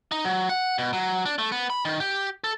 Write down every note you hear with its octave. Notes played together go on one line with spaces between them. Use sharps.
D#4
F#3
F#5
B2
F#3
D4
A3
B3
B5
D#3
G4
A4